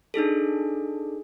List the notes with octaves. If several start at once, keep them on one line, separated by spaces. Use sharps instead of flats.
D4 D#4 G#4 A4